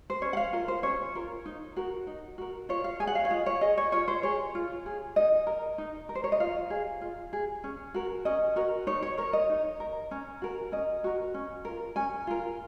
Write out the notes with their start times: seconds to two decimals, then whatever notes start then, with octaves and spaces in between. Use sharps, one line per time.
0.10 C5
0.22 C#4 C#5
0.33 F#5
0.37 F5
0.53 F4 A#4
0.68 C5
0.83 C#4 C#5
1.15 F4 A#4
1.46 D#4
1.76 F#4 A#4
2.07 D#4
2.38 F#4 A#4
2.69 F4 C#5
2.84 F5
3.00 G#4 G#5
3.07 F#5
3.15 F5
3.25 C#5
3.30 F4 D#5
3.46 C#5
3.61 G#4 D#5
3.78 C#5
3.92 F4 C#5
4.08 C5
4.23 G#4 C#5
4.55 F4
4.86 G#4
5.16 D#4 D#5
5.47 A#4
5.78 D#4
6.09 A#4
6.15 C5
6.24 C#5
6.32 D#5
6.40 F4 F5
6.70 G#4
7.01 F4
7.33 G#4
7.64 C#4
7.94 F#4 A#4
8.25 C#4 D#5
8.56 F#4 A#4
8.87 D#4 C#5
9.02 C#5
9.18 A#4 C#5
9.33 D#5
9.50 D#4
9.80 A#4
10.11 C#4
10.42 F#4 A#4
10.72 C#4 D#5
11.04 F#4 A#4
11.34 C#4
11.65 F4 A#4
11.96 C#4 G#5
12.27 F4 A#4